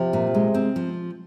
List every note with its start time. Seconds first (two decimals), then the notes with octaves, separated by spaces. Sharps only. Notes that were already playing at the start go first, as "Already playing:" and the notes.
Already playing: C3 F3
0.13 A#2
0.35 G#3
0.54 C4
0.76 F3